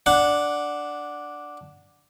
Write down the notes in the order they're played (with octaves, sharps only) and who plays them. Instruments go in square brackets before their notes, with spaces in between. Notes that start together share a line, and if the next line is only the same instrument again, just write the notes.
[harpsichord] D4 F#5